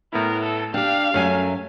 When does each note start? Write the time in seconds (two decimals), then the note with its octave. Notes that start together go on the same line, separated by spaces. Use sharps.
0.13 A2 B3 E4 A#4
0.43 A4
0.74 D4 G4 F5 G5
1.14 F#2 F#3 A3 G#5